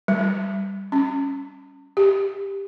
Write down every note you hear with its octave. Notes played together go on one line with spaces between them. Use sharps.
G3
C#4
G4